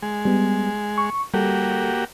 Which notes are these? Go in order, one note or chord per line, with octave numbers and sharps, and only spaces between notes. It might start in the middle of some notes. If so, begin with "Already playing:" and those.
G#3
G3 B3
C#6
G3 A#3 F#4 G4 A4